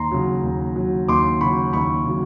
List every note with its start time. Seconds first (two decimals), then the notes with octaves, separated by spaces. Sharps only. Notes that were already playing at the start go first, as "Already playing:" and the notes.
Already playing: D#2 A#5 C6
0.11 C#3 F#3
0.43 D#2
0.76 C#3 F#3
1.08 D#2 C6 D6
1.41 C#3 F#3 B5 C#6
1.73 D#2 B5 C#6
2.06 C#3 F#3